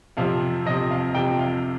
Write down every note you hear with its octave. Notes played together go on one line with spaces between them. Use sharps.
F2 C3 F3 F5
F2 C3 F3 D#5
F5
F2 C3 F3 G5
F5